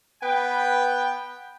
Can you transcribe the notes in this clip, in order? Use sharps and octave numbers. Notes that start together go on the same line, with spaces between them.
B3 B4 G5